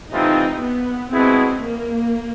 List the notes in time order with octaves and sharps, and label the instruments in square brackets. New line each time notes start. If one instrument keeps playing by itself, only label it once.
[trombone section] C3 E3 A3 C4 F4 [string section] D#4
[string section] B3
[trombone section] B2 G#3 B3 E4 G#4 [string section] C4
[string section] A#3